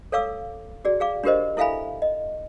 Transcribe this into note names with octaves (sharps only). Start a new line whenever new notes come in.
A4 C#5 F5 D6 E6
F#4 G#4 D5
G#4 F5 D6
D4 F4 G4 A#4 C5 D#5
E4 A4 E5 F5 G#5 B5
D#5